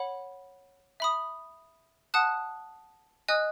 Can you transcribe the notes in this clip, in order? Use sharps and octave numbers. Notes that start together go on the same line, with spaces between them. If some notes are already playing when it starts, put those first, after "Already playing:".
Already playing: C#5 F#5 B5
E5 B5 D#6
F#5 A5 D#6 F#6
D#5 G#5 D#6 F#6